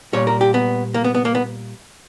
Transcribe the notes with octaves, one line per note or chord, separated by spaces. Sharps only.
A#2 G3 C#5
A#4
G4
B3
A#3
B3
B3
A#3
B3